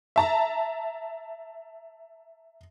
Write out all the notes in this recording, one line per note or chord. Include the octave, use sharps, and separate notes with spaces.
E5 A5 A#5